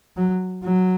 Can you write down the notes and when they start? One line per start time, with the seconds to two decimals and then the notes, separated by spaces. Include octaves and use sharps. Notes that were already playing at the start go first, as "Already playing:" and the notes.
0.17 F#3
0.64 F#3